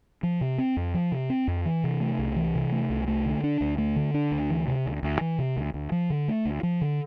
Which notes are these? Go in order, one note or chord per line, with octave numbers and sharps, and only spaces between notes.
F3
C3
C4
F2
F3
C3
C4
F2
E3
C3
A3
C2
E3
C3
A3
C2
A3
D3
D4
D2
A3
D3
D4
D2
E3
C3
D2
D2
E3
C3
D2
D2
F3
D3
A3
D2
F3
D3